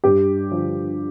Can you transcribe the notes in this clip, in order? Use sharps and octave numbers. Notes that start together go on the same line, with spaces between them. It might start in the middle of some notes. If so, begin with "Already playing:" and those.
G2 G4
D3 F3